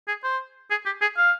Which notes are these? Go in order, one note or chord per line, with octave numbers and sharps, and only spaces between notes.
G#4
C5
G#4
G4
G#4
F5